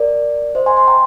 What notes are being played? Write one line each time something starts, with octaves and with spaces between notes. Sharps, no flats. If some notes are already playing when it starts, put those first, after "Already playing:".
Already playing: A#4 D5
C5 D#5
G#5 C6
G#5 C6
G5 A#5